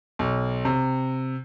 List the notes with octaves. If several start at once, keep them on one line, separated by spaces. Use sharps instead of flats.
B1
C3